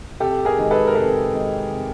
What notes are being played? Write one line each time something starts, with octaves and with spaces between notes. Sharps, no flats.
C3 G4 A4
G#4 A#4
D#3 G#3
A4 B4
A#4
C3 A4 B4
D#3 G#3
C3